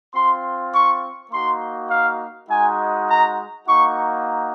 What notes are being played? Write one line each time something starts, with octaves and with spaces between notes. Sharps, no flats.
C4 F4 C6
C#6
A#3 D#4 F#4 C6
F5
G#3 D#4 F#4 G#5
A#5
A#3 D#4 F#4 C#6